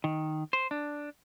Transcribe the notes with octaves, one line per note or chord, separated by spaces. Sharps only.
D#3
C5
D4